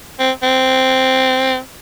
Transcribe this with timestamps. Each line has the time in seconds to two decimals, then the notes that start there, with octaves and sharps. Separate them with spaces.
0.20 C4
0.43 C4